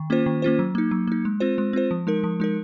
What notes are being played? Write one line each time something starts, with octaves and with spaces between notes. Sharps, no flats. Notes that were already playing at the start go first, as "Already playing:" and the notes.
Already playing: D#3
A#3 C#4 F4 C5
D#3
A#3 C#4 F4 C5
F#3
A#3 D#4
F#3
A#3 D#4
G#3
C4 F4 C5
G#3
C4 F4 C5
F3
G#3 D#4 A#4
F3
G#3 D#4 A#4